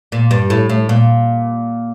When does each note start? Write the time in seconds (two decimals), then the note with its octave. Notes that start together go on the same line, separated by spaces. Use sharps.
0.12 A#2
0.31 G2
0.50 A2
0.70 A2
0.89 A#2